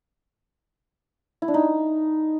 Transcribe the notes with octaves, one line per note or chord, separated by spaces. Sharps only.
E4
D4
D#4